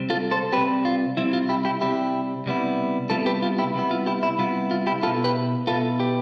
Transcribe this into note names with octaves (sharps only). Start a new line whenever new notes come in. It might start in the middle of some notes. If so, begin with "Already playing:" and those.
Already playing: C3 G3 C4
F4 A4
A4 C5
C3 G3 C4 G4 B4
F4
C3 G3 C4 E4
F4
E4 G4
E4 G4
C3 G3 C4 E4 G4
C3 G3 B3 E4
C3 G3 B3 E4 F4 A4
G4 B4
F4
E4 G4
C3 G3 B3 E4
F4
E4 G4
E4
C3 G3 B3 E4 F4
F4
E4 G4
B2 B3 E4 F4 A4
G4 B4
B2 B3 E4 F4 A4
G4 B4